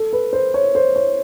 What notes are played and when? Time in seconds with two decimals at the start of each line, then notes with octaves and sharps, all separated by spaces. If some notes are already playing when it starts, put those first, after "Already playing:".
Already playing: A4
0.13 B4
0.33 C5
0.54 C#5
0.75 C5
0.96 C#5